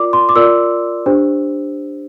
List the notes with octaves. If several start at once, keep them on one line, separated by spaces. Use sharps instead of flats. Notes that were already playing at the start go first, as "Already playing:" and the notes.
Already playing: F4 A#4 D5 D6
C6
D6
F4 A#4 D5 E6
D4 G4 C5